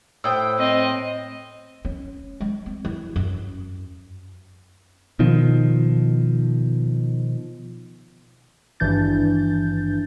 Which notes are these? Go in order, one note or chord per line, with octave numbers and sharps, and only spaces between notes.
A2 C5 G5 D#6 E6
C4 D#5
C#4
G#3
C4
E3
F#2
B2 D#3 F3
G#1 G2 E3 D4 G6 A6